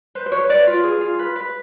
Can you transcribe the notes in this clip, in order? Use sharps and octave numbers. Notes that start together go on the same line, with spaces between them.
B4 C5
C5
B4 C#5
B4 D5
F4
G#4
F4
B4
B4